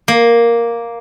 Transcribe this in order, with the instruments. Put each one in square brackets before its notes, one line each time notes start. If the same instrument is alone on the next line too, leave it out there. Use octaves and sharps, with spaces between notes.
[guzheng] A#3